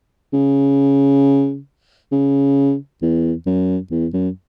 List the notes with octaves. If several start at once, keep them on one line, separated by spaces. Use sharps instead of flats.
C#3
C#3
E2
F#2
E2
F#2